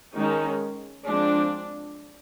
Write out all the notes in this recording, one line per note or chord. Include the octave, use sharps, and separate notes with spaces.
D#3 G#3 C#4 D#4
F3 G#3 C4 D4